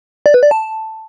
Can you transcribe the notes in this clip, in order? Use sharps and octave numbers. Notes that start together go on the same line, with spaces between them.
D5
B4
D5
A5